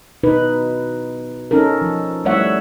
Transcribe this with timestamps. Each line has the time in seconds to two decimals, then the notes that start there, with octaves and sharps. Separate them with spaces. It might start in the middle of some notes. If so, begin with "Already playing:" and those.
0.23 B2 D#4 B4
1.51 C#4 D#4 A4 A#4
1.82 F3
2.25 G3 A3 C#5 E5 F#5